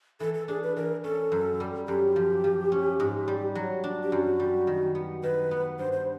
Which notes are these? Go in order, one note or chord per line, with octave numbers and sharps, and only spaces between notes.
E3 A4
A4
D4 G#4
B4
E3 A#4
C#4 A4
F#2
G3
F#2 G4
F3
F3
C#4
G#2
G3
F#3
D4
G4
F#2 F#4
G3
D#3
B3
D#3 B4
B3
G2 C5
C5